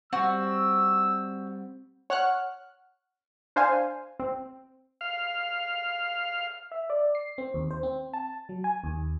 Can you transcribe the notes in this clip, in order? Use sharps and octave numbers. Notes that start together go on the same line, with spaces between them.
G3 C4 F#4 E6
C#5 F#5 F6 F#6
D4 C5 F5 G#5
C4
F5
E5
D5
C7
C4
D#2
C5
C4
A5
F#3
G#5
D#2